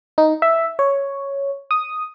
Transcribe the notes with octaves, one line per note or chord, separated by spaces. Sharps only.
D#4
E5
C#5
D#6